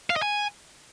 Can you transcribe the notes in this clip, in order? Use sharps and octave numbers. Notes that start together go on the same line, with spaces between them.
F5
D#5
G#5